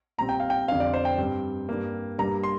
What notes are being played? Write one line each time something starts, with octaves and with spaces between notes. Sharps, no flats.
A#2 G3 C4 A#5
G5
F5
G5
F2 D3 G3 C4 F5
D5
C5
G5
G2 G3 C4
G2 G3 A#3
G2 G3 A#3 A#5
C6